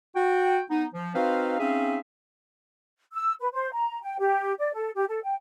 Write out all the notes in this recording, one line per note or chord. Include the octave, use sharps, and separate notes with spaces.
F#4 G5
B3 D#4
F3
C4 D#4 F#4 B4 C5 F5
C4 C#4 D#4 G#4 E5 F5
E6
B4
C5
A#5
G5
G4
D5
A4
G4
A4
G5